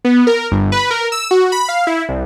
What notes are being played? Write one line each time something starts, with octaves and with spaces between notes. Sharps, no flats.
B3
A#4
G1
B4
A#4
E6
F#4
B5
F5
E4
C2